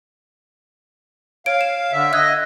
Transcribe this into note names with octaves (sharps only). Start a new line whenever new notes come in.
C#5 F5 D7
E7
D3 E5
D#5 E6 F#6 G#6